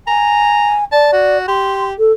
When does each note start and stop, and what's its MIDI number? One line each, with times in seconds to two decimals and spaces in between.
0.07 0.85 80
0.07 0.75 82
0.92 1.38 74
0.92 1.09 81
1.13 1.48 66
1.48 1.94 67
1.48 1.85 84
1.98 2.12 69